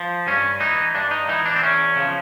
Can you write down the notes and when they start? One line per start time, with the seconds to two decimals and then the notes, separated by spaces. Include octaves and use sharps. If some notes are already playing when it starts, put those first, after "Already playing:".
Already playing: F3
0.27 G2 C#4
0.60 E3 D#4
0.95 G2 D4
1.11 D#4
1.28 E3 D#4
1.46 D4
1.56 C4
1.62 E2 C#4
1.96 C#3 F3